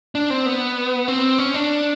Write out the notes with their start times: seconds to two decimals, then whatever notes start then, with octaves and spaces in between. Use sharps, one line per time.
0.15 D4
0.30 C4
0.46 B3
1.08 C4
1.38 C#4
1.54 D4